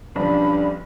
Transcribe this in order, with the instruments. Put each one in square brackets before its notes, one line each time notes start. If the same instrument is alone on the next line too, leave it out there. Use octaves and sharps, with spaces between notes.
[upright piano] B1 C#3 F3 [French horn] G2 [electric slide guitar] D4 [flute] B5